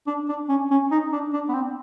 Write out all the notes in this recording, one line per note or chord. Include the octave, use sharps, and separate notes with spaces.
D4
D4
C#4
C#4
D#4
D4
D4
B3
C4